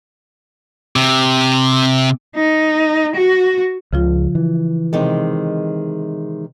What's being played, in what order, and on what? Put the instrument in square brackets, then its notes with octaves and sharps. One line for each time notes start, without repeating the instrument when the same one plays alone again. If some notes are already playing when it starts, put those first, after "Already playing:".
[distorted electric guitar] C3
[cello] D#4
F#4
[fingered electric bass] C#2 [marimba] C#3 F3 F4
[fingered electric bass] E3
[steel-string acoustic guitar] C3 D#3 G#3